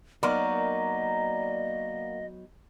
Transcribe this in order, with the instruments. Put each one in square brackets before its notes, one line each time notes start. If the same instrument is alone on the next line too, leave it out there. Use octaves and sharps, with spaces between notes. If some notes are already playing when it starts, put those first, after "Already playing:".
[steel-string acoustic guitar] F#3 B3 D#4 [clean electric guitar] A#3 F#4 A#4 [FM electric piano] D5 [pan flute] D#5